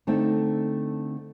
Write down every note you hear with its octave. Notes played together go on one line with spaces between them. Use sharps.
D3 A3 C4 D#4